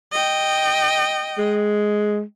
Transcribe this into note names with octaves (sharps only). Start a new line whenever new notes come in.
D#5 G5
G#3